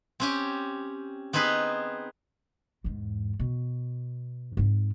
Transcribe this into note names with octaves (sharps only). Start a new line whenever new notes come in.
C4 C#4 G4
B3 C4 D#4 G#4 B4
E2 G#2
B2
G#2 C4